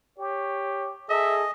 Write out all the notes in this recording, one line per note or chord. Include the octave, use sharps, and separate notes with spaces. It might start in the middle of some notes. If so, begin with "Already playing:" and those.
G4 C#5
G#4 A4 D#5 E5